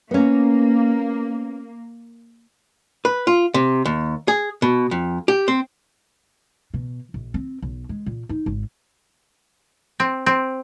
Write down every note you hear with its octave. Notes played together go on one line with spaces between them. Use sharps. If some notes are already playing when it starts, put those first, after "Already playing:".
A#3 B3 C#4
B4
F4
C3
D#2
G#4
B2
F2
G4
C4
B2
A#1
C4
B1
G#3
A#2
D#4
G#1
C4
C4